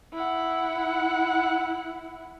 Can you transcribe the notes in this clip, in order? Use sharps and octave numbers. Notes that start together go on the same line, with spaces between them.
E4 F#5